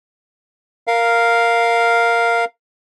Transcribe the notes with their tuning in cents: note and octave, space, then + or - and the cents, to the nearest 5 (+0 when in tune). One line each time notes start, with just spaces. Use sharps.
A#4 +0 F5 +0